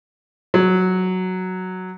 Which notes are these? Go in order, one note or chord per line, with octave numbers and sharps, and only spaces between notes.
F#3